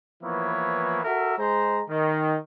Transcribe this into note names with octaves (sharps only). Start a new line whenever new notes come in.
E3 F3 A#3 B3 E4 C#5
F#4 A4 A#4 E5
G#3 C5 A#5
D#3